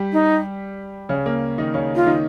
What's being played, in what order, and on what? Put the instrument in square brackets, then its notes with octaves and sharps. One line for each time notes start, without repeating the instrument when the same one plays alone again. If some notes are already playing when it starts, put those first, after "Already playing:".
Already playing: [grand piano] G3 G4
[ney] D#4
[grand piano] C#3 C#4
A#3
D#3 D#4
C#3 C#4
[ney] F4
[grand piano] D#3 D#4